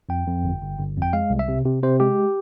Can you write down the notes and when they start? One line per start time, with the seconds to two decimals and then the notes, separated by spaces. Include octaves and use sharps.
0.09 F2 G5
0.27 F2
0.44 G1
0.62 G1
0.79 G1
0.97 F2
1.02 G5
1.13 G#3 F5
1.30 C2
1.39 E5
1.48 C3
1.65 C3
1.83 C3 C5
2.00 G#3 G4